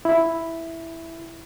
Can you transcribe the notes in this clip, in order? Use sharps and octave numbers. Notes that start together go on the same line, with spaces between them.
E4